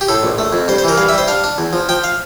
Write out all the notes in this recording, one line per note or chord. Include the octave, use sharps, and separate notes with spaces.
G4
A2 A4
A#1
A3
F2
G2 C5
C5
E3 A#4
G2 F5
E5
G3 C5
D4 F5
D4
E2
F3
F3 G5
F5